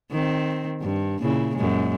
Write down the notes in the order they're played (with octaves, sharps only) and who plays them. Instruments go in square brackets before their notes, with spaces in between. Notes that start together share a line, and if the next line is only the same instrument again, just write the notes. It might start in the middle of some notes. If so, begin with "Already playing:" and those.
[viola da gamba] D#3 C4
G2
A#2 C#3 E4
F#2 A#2 G#3